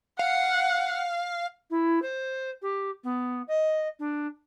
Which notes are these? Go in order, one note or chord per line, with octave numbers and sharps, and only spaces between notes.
F5 F#5
E4
C5
G4
B3
D#5
D4